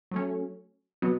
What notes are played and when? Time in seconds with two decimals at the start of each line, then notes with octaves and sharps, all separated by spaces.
0.11 F#3 A3 C#4
1.02 B2 F#3 B3